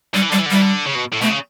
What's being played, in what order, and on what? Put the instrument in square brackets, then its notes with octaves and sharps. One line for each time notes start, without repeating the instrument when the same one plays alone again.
[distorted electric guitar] D3 [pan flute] G3
[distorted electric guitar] E3
[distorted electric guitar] D3 [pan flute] G3
[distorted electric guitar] E3
D3
[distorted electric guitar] E3 [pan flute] G3
[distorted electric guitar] D3
C#3
B2
A2
[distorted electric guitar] B2 [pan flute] A3
[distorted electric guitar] C#3